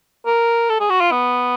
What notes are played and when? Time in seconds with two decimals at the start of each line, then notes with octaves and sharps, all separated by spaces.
0.26 A#4
0.70 A4
0.80 G#4
0.90 F#4
1.01 F4
1.11 B3